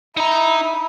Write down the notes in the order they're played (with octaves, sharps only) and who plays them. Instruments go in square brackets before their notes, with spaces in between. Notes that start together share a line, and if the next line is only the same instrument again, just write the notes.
[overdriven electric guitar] D#4 A#5 [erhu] E4